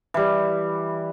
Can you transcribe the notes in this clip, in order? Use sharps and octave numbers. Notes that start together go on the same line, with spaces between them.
E3 G3